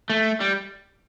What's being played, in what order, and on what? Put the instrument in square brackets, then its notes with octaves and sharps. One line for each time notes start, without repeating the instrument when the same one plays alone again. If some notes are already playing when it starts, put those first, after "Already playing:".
[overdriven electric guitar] A3
G3